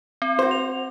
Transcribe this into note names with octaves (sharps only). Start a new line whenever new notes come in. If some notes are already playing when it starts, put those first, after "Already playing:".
C4
F#4 C5
F7